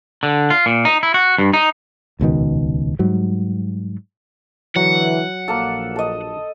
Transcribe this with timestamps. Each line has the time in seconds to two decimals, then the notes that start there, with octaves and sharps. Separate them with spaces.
0.23 D3
0.50 F4
0.66 A#2
0.85 D#4
1.03 E4
1.14 F#4
1.38 G2
1.53 D#4
2.19 D#1 C#2 B2 D#3
2.99 G#2 F#3 G3
4.76 D3 E3 F#3 F#5
5.48 A#1 A#3 A4
5.96 A4 D#5